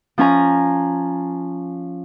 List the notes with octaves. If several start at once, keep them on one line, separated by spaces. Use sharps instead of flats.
F3 C#4 G#5 A#5